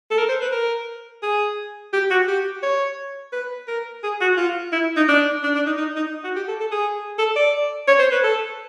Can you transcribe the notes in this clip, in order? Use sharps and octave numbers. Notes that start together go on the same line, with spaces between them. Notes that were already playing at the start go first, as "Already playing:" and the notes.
A4
A#4
C5
B4
A#4
G#4
G4
F#4
G4
C#5
B4
A#4
G#4
F#4
F4
E4
D#4
D4
D4
D4
D#4
D#4
D#4
F#4
G4
A4
A4
G#4
A4
D5
C#5
C5
B4
A4